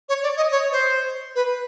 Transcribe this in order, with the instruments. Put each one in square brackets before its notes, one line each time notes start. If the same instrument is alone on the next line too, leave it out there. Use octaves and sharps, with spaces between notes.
[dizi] C#5
D5
D#5
C#5
C5
B4